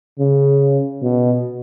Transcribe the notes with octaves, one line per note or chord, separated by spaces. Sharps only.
C#3
B2